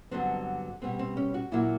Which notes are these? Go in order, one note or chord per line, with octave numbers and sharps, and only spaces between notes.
G2 D3 F#3 B3 C4
B2 G3 B3 C4
C4
C#4
F#4
A#2 F#3 A#3 E4